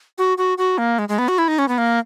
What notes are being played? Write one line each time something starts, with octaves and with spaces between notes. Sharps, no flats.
F#4
F#4
F#4
A#3
G#3
G#3
B3
F#4
E4
D#4
C#4
B3
A#3